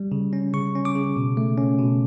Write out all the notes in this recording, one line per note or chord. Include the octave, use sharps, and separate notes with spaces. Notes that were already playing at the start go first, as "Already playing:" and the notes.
Already playing: G3
C#3
C#4
C#3 C#6
C#4
D6
C#3
B2
A3
C#4
B2